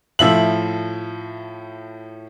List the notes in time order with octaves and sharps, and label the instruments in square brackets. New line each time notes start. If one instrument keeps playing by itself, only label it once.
[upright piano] A2 F3 E5 F#7